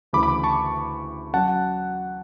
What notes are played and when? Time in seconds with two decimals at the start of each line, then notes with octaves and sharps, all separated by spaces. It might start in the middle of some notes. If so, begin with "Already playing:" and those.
0.13 D2 C#3 E3 B5 D6
0.23 B5 D6
0.44 A5 C#6
1.33 F#3 C#4 F#5 A5